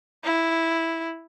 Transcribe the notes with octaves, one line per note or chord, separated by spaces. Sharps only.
E4